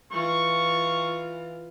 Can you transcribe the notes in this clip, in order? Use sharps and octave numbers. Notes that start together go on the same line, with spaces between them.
E3 F4 C#6